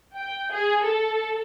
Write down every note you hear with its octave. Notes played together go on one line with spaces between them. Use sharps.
G5
G#4
A4